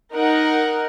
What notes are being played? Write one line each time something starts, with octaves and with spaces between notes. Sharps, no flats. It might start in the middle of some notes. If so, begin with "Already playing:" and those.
D#4 A#4 F#5